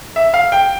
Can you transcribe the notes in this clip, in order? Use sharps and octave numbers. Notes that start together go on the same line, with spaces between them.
E5
F5
G5